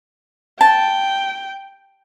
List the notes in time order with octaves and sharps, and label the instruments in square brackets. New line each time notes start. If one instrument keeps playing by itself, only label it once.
[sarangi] G5 [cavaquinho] A5